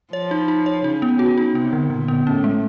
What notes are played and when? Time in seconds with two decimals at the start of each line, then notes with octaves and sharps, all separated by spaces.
0.13 F3 C#5
0.31 D#4
0.48 D#4
0.66 C#5
0.84 C#3 D#4
1.02 B3
1.19 F#4
1.38 D#4
1.55 C3 B3
1.73 D3
1.90 A#2 D3
2.08 B3
2.26 A2 C#4
2.44 G#3